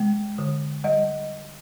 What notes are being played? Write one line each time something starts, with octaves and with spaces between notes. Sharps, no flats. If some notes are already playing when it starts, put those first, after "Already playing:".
Already playing: C3 G#3
D3
G3 D#5